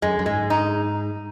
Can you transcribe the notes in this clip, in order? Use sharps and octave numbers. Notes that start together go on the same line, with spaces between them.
F#2 G#3
F#2
G#2 G#3
D#4